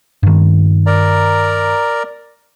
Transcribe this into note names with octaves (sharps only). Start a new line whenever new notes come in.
G2 D#3
A#4 D5 A#5